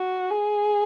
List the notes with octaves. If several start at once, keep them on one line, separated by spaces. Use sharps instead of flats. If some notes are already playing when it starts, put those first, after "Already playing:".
Already playing: F#4
G#4